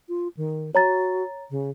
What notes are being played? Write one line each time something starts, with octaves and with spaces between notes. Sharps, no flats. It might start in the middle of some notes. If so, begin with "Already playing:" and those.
F4
D#3
F#4 C#5 A#5 A6
C#3